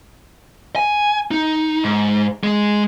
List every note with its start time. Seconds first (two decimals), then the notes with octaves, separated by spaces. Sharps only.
0.76 G#5
1.31 D#4
1.84 G#2
2.44 G#3